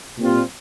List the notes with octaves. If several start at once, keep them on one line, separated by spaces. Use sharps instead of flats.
A#2 G3 C4 F4